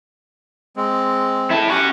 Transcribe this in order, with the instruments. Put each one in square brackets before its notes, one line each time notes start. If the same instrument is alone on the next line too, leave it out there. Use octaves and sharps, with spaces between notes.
[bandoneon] G#3 C4
[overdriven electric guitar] E4 A4
[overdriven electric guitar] C#4 F#4 [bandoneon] G4 F#5 G#5